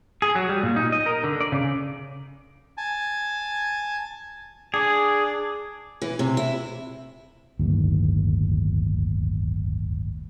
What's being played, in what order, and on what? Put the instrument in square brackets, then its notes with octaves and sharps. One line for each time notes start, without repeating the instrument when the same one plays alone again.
[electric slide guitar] G#4
F#3
G3
A#2
D#4
D#5
A#4
D3
D5
C#3
[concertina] G#5 A5
[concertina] D4 D5 [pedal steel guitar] G#4
[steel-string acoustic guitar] E3
C3
E4
[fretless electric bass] D1 G1 D#2